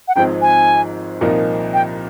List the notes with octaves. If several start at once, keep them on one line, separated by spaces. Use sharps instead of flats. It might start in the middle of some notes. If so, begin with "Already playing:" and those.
F#5
G#1 G#2 F3 G#3 C4 G5
G#5
C2 A#2 F3 A#3 D#4
G5